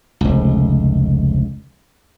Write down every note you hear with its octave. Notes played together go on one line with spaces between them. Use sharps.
F1 C#2